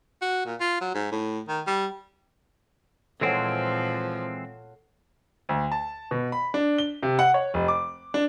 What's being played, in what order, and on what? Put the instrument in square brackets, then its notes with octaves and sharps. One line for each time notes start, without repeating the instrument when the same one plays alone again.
[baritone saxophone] F#4
A#2
F4
F#3
G#2
A2
D#3
G3
[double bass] A#2 [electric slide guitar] E3 G#3 C4 [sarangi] F3 [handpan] A4 C#5 F#5
[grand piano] D2
A5
B2
B5
D4
G7
C3
F#5
C#5
F1
D6
D4